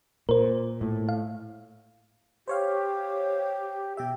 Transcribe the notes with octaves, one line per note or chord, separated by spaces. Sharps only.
A#2 A#4 C5
A2
F5
G4 C5 C#5 F5
B2 G4 E5 G5